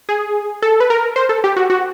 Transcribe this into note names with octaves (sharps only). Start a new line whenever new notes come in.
G#4
A4
B4
A#4
C5
A4
G4
F#4
F#4